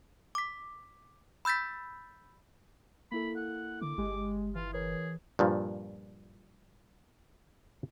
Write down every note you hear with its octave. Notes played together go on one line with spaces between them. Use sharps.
D6 B6
B5 E6 G6 A6 B6
A#3 E4 A4 B5
F#5
D3 D6
G1 G#3 G4
E3 F4
G#4 A#4 B4 C#5
G2 A#2 F3